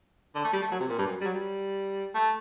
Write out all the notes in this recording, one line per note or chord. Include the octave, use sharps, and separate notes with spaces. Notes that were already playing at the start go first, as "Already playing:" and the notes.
D3
A3
G3
A3
F#3
C3
A#2
G2
F#2
G3
F#3
G3
A3